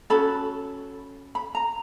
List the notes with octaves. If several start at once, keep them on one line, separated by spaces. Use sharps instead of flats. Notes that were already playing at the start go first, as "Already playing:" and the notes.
C#4 F#4 A4 B5
B5
A#5